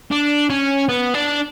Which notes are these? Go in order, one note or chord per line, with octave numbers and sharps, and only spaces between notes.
D4
C#4
B3
D4